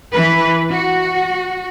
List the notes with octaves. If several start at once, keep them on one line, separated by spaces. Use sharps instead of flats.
E3 B4
F#4